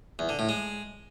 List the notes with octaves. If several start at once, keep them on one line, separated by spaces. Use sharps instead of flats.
E2
D3
A2
G#3